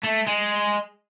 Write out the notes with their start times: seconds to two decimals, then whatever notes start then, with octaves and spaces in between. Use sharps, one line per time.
0.03 A3
0.27 G#3